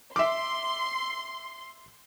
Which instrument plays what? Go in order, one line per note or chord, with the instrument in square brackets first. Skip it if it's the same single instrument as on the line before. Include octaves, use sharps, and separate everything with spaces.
[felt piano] E5 D6 [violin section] C6